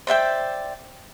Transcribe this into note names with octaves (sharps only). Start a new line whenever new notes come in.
C5 D5 E5 G5